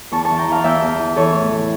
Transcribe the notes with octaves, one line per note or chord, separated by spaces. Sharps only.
E2 A5 C#6
A5 C#6
E3
G5 A#5
E3 F5 A5
E2 E5 G5
E2
E3
E3 A4 C#5
A2
E3